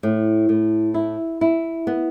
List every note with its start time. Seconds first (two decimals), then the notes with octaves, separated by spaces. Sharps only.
0.03 A2
0.49 A2
0.94 E4
1.41 E4
1.87 B3